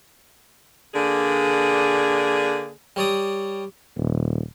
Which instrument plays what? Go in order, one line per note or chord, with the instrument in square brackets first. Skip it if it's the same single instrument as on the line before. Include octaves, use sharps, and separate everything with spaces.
[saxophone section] D3 A#3 D4 G#4
[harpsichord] G3 C#5 D5 D#6
[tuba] D#1